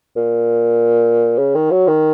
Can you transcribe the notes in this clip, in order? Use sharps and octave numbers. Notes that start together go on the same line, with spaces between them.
A#2
C#3
D#3
F#3
D#3